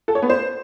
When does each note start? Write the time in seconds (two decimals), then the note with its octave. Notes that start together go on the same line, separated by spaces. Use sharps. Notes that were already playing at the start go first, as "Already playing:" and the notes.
0.08 A4
0.15 C#5
0.22 B3
0.30 C5